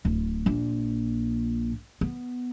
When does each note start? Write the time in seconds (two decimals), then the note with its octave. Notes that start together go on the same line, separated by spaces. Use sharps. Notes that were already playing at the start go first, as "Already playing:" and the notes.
0.05 D1
0.46 A#1 A#2
2.01 B3